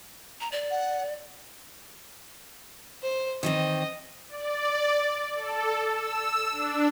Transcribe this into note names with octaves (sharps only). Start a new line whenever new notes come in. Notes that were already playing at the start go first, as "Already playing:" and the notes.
A#5
D5
F#5
C5
D#3 E3 C4 D#5
D5
A4
E6
D4